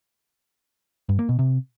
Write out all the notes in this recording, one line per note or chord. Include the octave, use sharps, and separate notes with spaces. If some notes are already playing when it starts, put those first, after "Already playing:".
G2
A#3
B2
C3